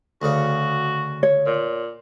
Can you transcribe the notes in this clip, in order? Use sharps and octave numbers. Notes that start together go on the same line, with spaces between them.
D2 C#3 F#4
C#5
A#2